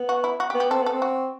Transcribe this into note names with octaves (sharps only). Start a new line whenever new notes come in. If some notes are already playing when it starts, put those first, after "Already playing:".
Already playing: B3
F#4
E4
F#4
G4
B3
G4
C4 A4
B3 A4
C4
F#4